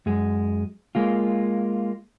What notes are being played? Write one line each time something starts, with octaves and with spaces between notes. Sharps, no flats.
F#2 G#3
G#3 A#3 F4